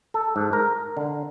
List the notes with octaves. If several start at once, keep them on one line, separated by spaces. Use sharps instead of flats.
A4
G#2
A#4
D3